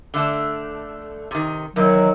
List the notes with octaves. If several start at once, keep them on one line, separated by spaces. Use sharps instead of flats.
D3 A3 D4
C3 D#3
E2 D#3 E3 F#3